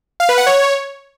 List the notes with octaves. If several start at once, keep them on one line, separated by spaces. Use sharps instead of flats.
F5
B4
F#5
C#5